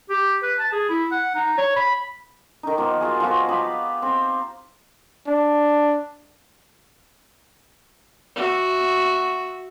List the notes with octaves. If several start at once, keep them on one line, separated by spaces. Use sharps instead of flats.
G4
B4
A5
G#4
E4
F#5
D#4
C#5
B5
D#3 D#4
F3 A#3 B3
F4 F#4 G#4
F3 B3 F4 F#4
G4 B4 F5 B5
C4
D4
F#4 E5